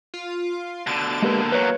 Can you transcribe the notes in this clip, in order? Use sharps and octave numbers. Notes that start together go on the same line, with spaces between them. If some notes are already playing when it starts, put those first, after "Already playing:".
F4
B2 D3 A6
G#3 A#3 G4 B4
E2 F#3 B4 C#5